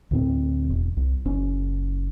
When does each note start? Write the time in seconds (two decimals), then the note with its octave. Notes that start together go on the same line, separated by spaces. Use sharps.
0.11 D2 A2 C4
0.69 E1
0.97 C2
1.25 F#1 C#4